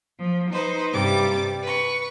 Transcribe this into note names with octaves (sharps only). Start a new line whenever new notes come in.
F3
D#4 B4 C5
G2 C3 G3 D6 A6
B4 C#6